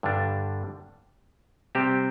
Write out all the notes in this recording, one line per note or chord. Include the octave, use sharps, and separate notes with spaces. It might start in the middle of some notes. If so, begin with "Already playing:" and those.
G2 D3 G3 D4
C3 G3 C4 G4 C5